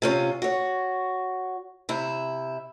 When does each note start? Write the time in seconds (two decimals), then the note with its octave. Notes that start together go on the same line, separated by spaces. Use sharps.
0.02 C3 C#4 F4
0.42 F#4 C#5
1.89 C3 E4